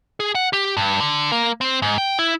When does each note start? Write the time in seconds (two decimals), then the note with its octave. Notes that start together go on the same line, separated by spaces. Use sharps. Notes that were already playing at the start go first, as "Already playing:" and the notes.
0.20 G#4
0.35 F#5
0.53 G4
0.77 G2
1.00 D3
1.32 A#3
1.61 C4
1.82 G#2
1.98 G5
2.19 E4